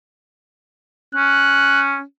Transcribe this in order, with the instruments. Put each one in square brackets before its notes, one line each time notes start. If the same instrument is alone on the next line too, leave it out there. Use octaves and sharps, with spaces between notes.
[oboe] C#4 [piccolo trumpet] F#6